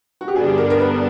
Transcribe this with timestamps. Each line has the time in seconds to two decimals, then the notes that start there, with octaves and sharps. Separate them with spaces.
0.21 F#4
0.28 G4
0.35 G2 D3 G3 B3 D4 G#4
0.58 A#4
0.70 A#4
0.80 B4